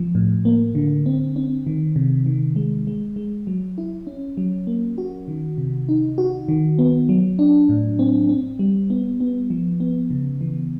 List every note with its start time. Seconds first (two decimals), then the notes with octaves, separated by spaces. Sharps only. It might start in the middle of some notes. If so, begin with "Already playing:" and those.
Already playing: F3
0.15 A2
0.45 A#3
0.75 D3
1.06 C4
1.36 C4
1.67 D#3
1.96 C3
2.26 D#3
2.56 G#3
2.87 G#3
3.16 G#3
3.47 F#3
3.78 E4
4.07 C#4
4.37 F#3
4.67 A#3
4.98 F#4
5.28 D#3
5.58 C3
5.89 D#4
6.18 F#4
6.49 D#3
6.79 B3
7.09 F#3
7.39 D4
7.69 A2
7.99 C4
8.29 C4
8.59 G3
8.90 B3
9.20 B3
9.50 F3
9.80 B3
10.11 C#3
10.41 E3